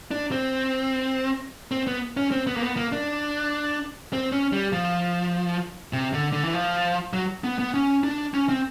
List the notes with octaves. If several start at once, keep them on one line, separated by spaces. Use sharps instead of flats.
D4
C4
C4
B3
C#4
C4
B3
A#3
B3
A#3
D4
C4
C#4
G3
F3
C3
D3
D3
E3
F3
F#3
B3
B3
C#4
D4
C#4
C4